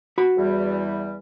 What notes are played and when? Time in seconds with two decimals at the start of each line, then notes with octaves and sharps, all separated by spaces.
0.18 F#4 B5
0.37 E2 E3 G3